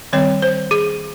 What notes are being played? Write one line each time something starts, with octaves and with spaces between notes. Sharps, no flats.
D#3 G3 C4 C#5
C5
G#4